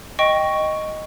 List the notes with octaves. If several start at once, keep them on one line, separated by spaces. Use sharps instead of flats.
D#5 G5 C#6